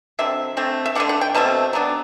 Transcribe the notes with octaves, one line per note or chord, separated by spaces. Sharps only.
D3 F#3 C4 E5
D3 A3 C4
E5
D3 A3 D4 F#5
F#5
G5
B2 A3 C4 A5
F#3 B3 D4